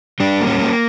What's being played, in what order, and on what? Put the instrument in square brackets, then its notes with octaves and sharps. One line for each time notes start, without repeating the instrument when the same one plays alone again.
[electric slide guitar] G3 D4
A#3
C#4
A#3